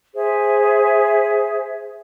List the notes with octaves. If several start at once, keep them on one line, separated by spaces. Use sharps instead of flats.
G#4 C5 E5